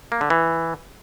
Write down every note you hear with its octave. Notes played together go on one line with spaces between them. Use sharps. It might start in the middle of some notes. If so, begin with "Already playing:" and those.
A#3
D3
E3